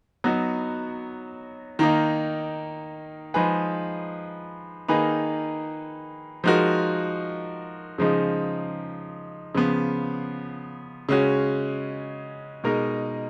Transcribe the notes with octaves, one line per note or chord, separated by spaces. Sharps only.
F#3 B3 D#4 F#4
D#3 A#3 D#4
F3 G#3 D#4 G#4 B4
D#3 A#3 D#4 G#4 B4
F3 G#3 D#4 F#4 A#4
C#3 F3 G#3 D#4
C#3 F3 B3
C#3 G#3 C#4 F#4
B2 G#3 D#4 A#4